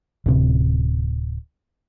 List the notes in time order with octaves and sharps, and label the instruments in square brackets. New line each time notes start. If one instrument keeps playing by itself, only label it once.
[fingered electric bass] D1 C3